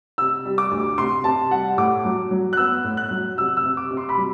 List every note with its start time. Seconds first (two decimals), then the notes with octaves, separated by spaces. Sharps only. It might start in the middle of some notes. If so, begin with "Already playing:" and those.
0.18 C3 E6
0.45 G3
0.58 D6
0.71 D2
0.98 C3 C6
1.24 C3 A5
1.51 G3 F#5
1.78 A2 D6
2.05 F#3
2.31 F#3
2.53 F#6
2.57 B3 E6
2.84 A2
2.97 F#6
3.11 F#3
3.38 C3 E6
3.57 E6
3.63 C3
3.77 D6
3.91 C3
3.97 C6
4.09 B5
4.18 F#3